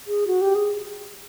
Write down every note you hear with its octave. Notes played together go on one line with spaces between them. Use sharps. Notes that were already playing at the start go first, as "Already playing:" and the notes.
G#4
F#4
G4
G#4